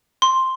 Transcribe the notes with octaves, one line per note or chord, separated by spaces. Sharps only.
C6